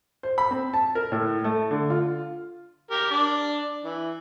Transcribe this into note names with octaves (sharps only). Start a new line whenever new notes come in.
C5
B5
C4
A5
A#4
A2
A3
D3
F4
G4 A#4
D4 D5
E3